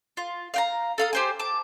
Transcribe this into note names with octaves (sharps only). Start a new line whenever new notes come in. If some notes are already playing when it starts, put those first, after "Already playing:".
F4
F5 G5 A#5
A4 F5 D#6
G4 C5 G#5
A5 D6